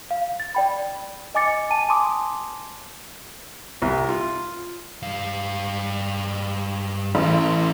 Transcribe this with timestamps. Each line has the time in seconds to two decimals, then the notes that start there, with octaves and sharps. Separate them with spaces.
0.11 F5
0.40 A6
0.55 D5 G5 B5
1.35 D#5 G#5 D6 A6 C#7
1.70 G#5 A5 D#7
1.89 G#5 A5 C6 D6 D#6
3.82 C2
4.09 F4
5.02 G2 F5
7.15 A1 E3 A3